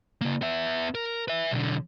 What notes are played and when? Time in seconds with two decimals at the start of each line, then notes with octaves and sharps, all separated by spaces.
0.21 C#3 A#3
0.42 B3 E5
0.95 A#4
1.28 B4 E5
1.51 B1 D3